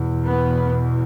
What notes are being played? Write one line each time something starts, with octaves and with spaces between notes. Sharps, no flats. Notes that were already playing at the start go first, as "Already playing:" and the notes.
Already playing: E2 B2
B3